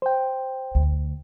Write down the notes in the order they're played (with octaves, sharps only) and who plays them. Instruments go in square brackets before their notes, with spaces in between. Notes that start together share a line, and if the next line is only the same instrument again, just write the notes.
[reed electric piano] C5 G5
[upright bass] D2